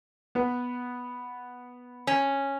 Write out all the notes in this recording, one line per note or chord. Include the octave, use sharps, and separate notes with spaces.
B3 B4
C#4